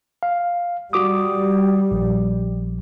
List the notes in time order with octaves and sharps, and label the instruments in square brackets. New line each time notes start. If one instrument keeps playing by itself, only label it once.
[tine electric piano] F5
[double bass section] G3 [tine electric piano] F#4 D6 D#6
[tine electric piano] A#1